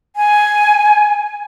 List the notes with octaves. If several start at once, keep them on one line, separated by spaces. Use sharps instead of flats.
G#5